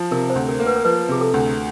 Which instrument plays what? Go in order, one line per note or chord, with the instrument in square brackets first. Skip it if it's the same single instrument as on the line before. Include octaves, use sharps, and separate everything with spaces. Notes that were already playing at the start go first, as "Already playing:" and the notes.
Already playing: [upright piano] F3
[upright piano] C3 [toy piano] A#4
[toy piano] C5
[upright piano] D2
[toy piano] A#4
[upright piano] A#3
[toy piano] B4
A#4
[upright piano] F3 [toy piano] B4
[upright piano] C3 [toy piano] G#4
[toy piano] A4
[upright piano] D2